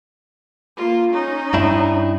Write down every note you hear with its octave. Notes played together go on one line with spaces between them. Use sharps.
A#3 F4
C#4 D#4
G2 D4 E4